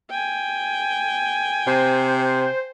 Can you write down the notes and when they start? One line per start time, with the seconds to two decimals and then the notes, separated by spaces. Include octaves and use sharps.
0.10 G5 G#5
1.67 C3 C5